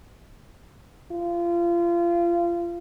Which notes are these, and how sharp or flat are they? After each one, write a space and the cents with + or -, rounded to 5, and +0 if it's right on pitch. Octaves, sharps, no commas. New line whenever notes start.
F4 -25